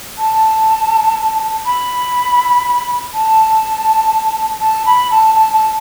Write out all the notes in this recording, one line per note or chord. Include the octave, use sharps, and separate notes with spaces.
A5
B5
A5
A5
B5
A5
A5
A5